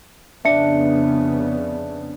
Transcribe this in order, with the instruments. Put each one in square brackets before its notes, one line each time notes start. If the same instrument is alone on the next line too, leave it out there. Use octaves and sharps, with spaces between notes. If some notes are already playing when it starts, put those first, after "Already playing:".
[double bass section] F2 C#3 B3 [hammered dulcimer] D4 [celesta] E5 C#7